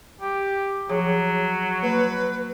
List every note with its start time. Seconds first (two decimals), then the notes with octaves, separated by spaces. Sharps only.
0.21 G4
0.90 F3 F#3 G#4 C#5
1.83 A#3 B4